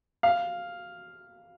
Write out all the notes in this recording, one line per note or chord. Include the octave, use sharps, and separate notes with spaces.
F5